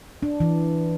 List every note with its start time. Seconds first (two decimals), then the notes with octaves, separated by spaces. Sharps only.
0.23 D4
0.40 E3